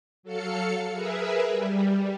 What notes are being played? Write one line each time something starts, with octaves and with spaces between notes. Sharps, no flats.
F#3 A4 F5 C#7
G#4 A#4 B4 E5
G3